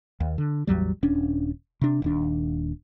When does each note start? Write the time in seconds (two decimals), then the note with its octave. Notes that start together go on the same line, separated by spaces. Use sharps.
0.20 D#2
0.38 D3
0.67 A1 E2 F#3 G3
1.03 D#1 C#4 D4
1.81 C3 D4
2.02 D#1 D#2 D4